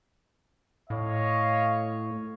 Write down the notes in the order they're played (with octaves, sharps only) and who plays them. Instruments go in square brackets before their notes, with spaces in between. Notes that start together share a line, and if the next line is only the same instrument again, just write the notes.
[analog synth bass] A2 [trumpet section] C#5 D#5 F5